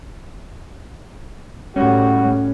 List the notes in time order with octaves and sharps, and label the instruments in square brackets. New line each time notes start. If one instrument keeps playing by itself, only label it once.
[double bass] A2 G3 [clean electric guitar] C#4 [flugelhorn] F#4